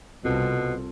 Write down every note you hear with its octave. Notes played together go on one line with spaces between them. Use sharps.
C2 B2 C4 F4 A4